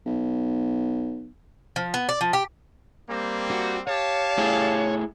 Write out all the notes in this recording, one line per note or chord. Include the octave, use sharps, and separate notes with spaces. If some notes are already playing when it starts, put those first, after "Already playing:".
B1
F3
B3
D5
F3
G4
G3 A#3 C4
F#4
G4 C#5 F5 A5
A3 E4 G#4